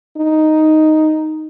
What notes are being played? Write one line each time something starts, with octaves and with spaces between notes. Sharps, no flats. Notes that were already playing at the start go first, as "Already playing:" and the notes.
D#4